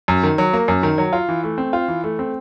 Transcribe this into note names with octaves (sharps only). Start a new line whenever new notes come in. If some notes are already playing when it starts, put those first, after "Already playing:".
F#2
D#3
F#3
A#3
F#2
D#3
F#3
F4
E3
A3
C4
F4
E3
A3
C4